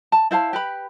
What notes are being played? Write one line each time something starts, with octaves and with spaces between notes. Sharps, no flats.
A5
E4 C5 F5 A5
G4 B4 B5